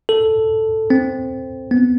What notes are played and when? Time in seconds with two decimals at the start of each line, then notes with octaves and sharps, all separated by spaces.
0.09 A4
0.90 C4
1.71 B3